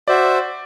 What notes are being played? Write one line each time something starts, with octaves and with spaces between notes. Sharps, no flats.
F#4 C5 D5 E5